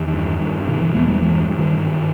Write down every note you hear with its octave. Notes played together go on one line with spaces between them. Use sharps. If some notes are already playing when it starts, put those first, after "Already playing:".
Already playing: E2 D#3
G2
G2
B2 D#3
E3
E2 G#3 B3
G3 A#3
G2 E3 G#3
G2
D#3 G3
G#2